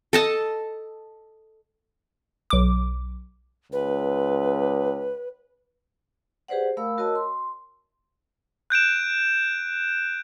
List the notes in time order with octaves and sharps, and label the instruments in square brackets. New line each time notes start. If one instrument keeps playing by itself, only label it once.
[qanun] A4 D#5 A5
[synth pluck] B1 D6
[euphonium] C#2 [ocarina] B4
[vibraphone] G4 G#4 B4 C5 D5 F#5
A3 A#4 F5 B5 E6
F#4 A#4 C#5 D#5 A5 E6
C6
[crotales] F#6 G6 D7 E7